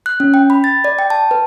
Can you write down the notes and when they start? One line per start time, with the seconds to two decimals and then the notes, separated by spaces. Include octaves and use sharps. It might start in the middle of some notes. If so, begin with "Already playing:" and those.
0.06 F#6
0.20 C#4
0.34 G5
0.50 B5
0.64 A6
0.84 D5
0.99 G5
1.10 A5
1.31 B4